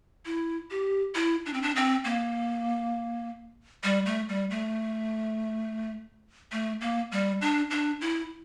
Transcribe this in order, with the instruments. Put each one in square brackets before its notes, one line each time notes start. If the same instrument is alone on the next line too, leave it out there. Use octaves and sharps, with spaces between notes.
[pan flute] E4
G4
E4
D4
C4
D4
C4
A#3
G3
A3
G3
A3
A3
A#3
G3
D4
D4
E4